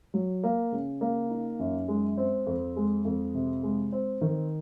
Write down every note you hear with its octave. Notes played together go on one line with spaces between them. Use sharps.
F#3
A#3
C#3
A#3
D#4
F#2
G#3
C4
F2
G#3
F2
C3
G#3
C4
D#3